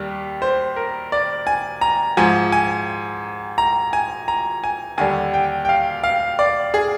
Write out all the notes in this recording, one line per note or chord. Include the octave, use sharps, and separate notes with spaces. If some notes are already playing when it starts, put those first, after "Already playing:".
Already playing: D#2 G3
C5
A#4
D5
G#5
A#5
G#2 F3 G#5
G#5
A#5
G#5
A#5
G#5
D#2 D3 G3 G#5
G5
G5
F5
F5
D5
G#4